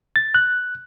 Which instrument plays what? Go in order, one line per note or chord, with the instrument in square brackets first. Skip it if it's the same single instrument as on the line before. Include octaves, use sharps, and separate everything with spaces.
[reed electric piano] A6
F#6